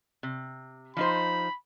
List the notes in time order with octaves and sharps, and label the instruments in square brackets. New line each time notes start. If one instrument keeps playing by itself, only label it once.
[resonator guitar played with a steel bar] C3
[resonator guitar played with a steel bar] F3 D#4 C5 [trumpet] B5